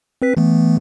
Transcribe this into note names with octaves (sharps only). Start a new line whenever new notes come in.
C4 B4 B6
E3 A3 B3